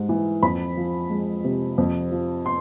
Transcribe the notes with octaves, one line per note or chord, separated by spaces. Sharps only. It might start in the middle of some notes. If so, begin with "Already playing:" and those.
Already playing: G#2 G3
E3
F2 B5
F3
G#3
C3
F2
F3
C6